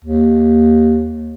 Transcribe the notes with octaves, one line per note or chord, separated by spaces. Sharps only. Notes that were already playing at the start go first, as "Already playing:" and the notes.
D#2